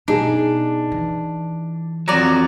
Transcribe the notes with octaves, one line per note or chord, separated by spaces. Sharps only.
B2 D4 D#4 G#4
E3
F2 F#3 D5 A#5